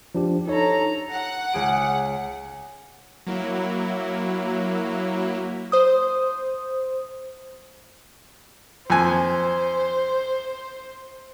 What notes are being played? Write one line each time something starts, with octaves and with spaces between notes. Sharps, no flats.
F3 D4 G4
D#4 A4 C#5 A#5
F#5
C#2 G#4 D7
F#3 A#3 E4
C5 D#6
F2 C5 G#5